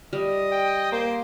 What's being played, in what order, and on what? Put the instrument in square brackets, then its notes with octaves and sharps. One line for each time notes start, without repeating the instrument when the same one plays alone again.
[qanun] G3 [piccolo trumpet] D#5
[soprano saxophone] G5
[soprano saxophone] A#3 [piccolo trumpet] C5